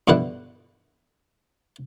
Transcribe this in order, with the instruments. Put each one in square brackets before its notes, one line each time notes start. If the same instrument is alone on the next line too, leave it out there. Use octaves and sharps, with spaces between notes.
[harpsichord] G2 B2 D3 E4 F#5